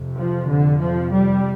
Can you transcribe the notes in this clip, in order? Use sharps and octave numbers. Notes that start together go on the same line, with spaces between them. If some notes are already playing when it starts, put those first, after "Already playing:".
Already playing: F2 C3
F3
D3
F3
G3